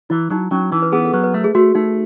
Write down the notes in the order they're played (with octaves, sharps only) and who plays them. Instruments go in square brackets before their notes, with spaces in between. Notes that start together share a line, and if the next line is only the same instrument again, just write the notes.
[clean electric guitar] E3 [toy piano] E4
[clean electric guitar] F#3 [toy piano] D#4
[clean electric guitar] F#3 [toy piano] C#4
[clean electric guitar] E3 [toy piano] D#4
[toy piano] B4
[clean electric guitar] B3 [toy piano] G#4
[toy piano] A4
[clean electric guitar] F#3 [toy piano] B4
[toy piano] B4
[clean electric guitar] A3 [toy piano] A4
[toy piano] G#4
[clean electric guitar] A3 [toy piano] F#4
[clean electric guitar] A3 [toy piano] D#4